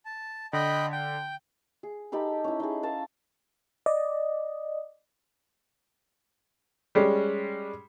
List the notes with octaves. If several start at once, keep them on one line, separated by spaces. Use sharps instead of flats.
A5
D3 D#5 G5 B5
G5
G#4
D#4 G4 A4 B5
C#4 E4
D#4 G#4
C#4 F5 A5 E6
D5 D#5
G3 G#3 C#4